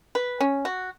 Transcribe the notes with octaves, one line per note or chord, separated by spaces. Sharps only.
B4
C#4
F#4